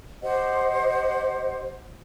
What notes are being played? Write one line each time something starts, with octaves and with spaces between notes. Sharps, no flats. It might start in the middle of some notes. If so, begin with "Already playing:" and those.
G4 C5 D#5 F#5